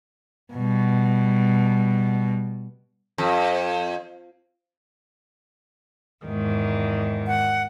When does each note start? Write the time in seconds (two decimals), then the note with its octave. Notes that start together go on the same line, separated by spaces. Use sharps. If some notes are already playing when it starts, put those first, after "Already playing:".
0.53 B2 G3
3.18 F2
6.26 E2 G#2 D#3
7.27 F#5